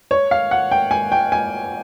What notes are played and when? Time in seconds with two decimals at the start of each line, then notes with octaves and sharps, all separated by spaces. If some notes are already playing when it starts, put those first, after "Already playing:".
0.11 C#5
0.31 F5
0.51 F#5
0.71 G5
0.91 G#5
1.12 G5
1.32 G#5